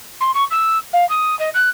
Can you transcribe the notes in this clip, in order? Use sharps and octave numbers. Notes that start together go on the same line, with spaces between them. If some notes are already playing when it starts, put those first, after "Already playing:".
C6
C#6
E6
F5
D#6
D#5
F#6